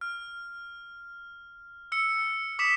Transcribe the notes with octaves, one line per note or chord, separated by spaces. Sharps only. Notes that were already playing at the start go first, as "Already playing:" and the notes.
F6
E6 C#7
D6 D#6 B6 C#7 E7